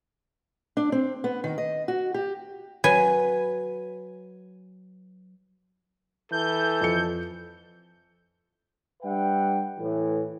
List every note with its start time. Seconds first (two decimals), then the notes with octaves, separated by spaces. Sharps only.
0.77 D4
0.92 C4
1.24 B3
1.44 D#3
1.58 D#5
1.88 F#4
2.14 G4
2.84 F#3 B4 G#5
6.32 E3 A4 G6
6.81 F2 C#7
9.03 G3 D4 B4 E5 F#5 G5
9.78 A2 E3